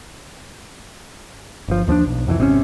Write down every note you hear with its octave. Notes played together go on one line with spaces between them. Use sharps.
G1 F3
D#2 F3 C#4 D4
B1
C2 F2 C#3 E3
G#1 C3 D#3 C#4